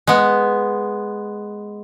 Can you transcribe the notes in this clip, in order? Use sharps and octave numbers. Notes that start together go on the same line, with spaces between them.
G#3 B3